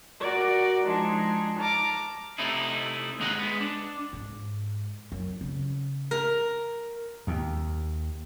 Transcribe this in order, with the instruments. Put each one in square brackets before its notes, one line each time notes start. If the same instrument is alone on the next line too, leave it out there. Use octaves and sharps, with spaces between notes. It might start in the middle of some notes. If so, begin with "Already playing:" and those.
[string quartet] F#4 A#4 D5
F3 G#3 D4 D#4 G#4
A5 A#5 D6 F6
[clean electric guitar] C3 A3 D#4 E4
D#2 G#2 G#3 D#4 D#5 F#5
G#3 B3
D4
[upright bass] G#2
F#2
C#3
[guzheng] A#4
[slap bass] D#2